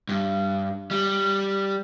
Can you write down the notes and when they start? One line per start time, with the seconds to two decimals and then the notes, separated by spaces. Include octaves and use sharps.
0.09 G2
0.91 G3